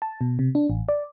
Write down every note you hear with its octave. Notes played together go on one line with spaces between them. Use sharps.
A5
B2
C3
D4
A1
D5